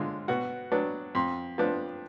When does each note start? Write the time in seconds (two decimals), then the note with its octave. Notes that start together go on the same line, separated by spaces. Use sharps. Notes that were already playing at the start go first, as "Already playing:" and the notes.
Already playing: D3 G#3 F4
0.28 B2 F#4
0.72 F#3 B3 D4
1.15 F2
1.58 F3 B3 D4